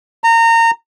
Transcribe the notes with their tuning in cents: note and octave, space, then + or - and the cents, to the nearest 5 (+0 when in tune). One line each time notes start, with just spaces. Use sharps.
A#5 -25